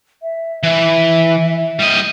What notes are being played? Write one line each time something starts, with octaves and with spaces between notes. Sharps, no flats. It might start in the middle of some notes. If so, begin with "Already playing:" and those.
E5
E3 E5
G3 D#5